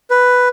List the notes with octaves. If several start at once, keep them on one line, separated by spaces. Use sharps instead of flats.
B4